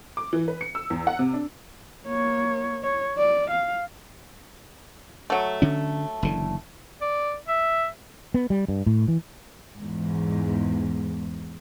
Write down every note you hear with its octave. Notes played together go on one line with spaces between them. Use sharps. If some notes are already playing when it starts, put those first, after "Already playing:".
D6
E3
B4
C#7
E6
E2
F#5
C3
D4
A#3 C#5
C#5
D5
F5
F#3 A3
D3 C#4
F#1 D3 E3
D5
E5
B3
G3
G2
A2
E3
E2 G#2